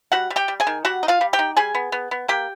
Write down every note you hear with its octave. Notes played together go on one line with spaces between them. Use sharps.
G3 F#4 F#5
G3
G4 G5
G3
G#4 G#5
D#3
G3 F#4 F#5
D#4
F4 F5
G3
G4 G5
D#4
G3 G#4 G#5
B3
B3
B3
A#3 G4 G5